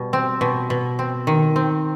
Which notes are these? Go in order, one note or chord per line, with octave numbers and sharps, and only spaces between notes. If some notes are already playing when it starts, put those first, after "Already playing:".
Already playing: B2 G3
C4
B2
B2
C4
D#3
C4